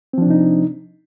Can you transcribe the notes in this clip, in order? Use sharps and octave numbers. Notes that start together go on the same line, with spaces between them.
C3 F3 C4 D4 D#4